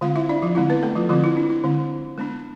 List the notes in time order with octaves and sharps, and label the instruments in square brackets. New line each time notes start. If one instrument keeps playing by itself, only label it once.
[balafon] D3 G#3 C4 F4 F5
E4 E5
D4 D5
F3 F4
D3 G#3 C4 E4
B3 B4
A3 A4
F3 F4
D3 F3 G#3 C4 F4
E4
D4
E4
D3 G#3 C4
G#3 B3 D4